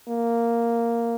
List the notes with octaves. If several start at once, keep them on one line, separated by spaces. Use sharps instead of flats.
A#3